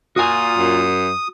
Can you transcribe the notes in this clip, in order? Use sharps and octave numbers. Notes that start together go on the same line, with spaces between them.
A#2 F4 F#4 G#5 D#6
F#2